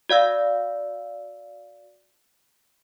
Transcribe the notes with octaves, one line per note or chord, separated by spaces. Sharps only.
F#4 D5 F5 E6